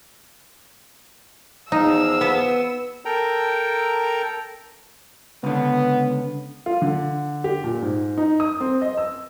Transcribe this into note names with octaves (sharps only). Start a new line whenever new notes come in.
E2 F3 D#4 F5 E6
B3
A4 A#4 G5 A#5
C#2 D3 B3
F4
D3
G4
A#2
G#2
D#4
D#6
C4
D#5
E6